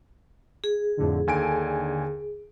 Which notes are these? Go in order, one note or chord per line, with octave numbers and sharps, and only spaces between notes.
G#4
F2 A2 D3
D#2 D3 G#5 D7